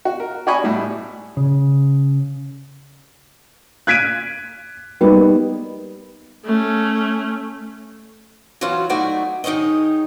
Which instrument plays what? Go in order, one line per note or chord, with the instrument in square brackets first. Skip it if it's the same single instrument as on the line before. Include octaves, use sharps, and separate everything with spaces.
[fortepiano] F#4
A#4
F#4 D5 D#5 G#5 B5 C#6
A2 G3
[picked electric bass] C#3
[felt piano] F#6 G#6 B6 D7 D#7
G3 A#3 B3 D#4
[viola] A3 C#4
[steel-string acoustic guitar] E3 F#3 C#4 F4 F#4
F#3 A3 D#4 E4 F#4 D5
D#3 D#4 G#4 C#5 D#5